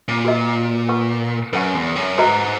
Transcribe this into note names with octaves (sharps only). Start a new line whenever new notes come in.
A#2
F#4 B4 D#5
B4 F#5 C#6
F#2 B4 F#5 C#6
E2
F#2
G#2 F#4 B4 D#5 A#5